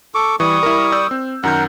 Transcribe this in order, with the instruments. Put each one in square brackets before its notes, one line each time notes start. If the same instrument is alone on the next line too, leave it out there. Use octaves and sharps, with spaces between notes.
[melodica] A4 C#6 D6
[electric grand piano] E3 [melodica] G3 C#6 D#6
[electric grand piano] E4 A#4
D5 E6 G6
C4
[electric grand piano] F#2 D#3 G6 [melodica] A#4 F#5